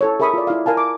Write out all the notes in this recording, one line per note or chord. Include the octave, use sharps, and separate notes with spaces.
E4 A4 C#5
G#4 A#4 E5 B5 C#6 D#6
F4 D5
E4 F5
A#4 F5 G#5 A5
D6